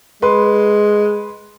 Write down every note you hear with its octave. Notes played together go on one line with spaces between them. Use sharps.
G#3 B4 C6